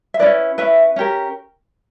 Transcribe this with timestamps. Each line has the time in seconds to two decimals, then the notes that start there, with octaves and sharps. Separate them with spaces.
0.14 E5
0.19 C#4 E4 B4 D5
0.58 C#4 E4 B4 E5
0.96 C#4 G4 A#4